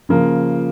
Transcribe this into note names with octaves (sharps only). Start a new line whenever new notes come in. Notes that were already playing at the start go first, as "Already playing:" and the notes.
C#3 F3 A#3